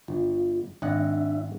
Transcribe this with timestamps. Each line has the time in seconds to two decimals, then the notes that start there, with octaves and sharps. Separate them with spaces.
0.08 G1 F4
0.82 G#1 D4 D#5 E5 F#5